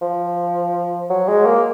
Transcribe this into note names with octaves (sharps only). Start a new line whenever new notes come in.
F3
F#3
G#3
A#3